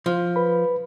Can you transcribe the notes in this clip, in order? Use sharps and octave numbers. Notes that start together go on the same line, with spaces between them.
F3
B4 B5